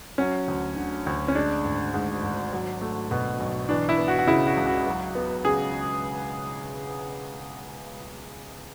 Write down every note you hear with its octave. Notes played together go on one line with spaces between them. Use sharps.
F#3 C#4
D2
D3
D2
C#4
G#3 D4
G#1
G#2
G#1
F#3
A3
B2
B1
E3 D4
E4
B3
F#4
F#4
C#3 E4
F#4
C#2
F#4
F#3
B3
C#3 G#4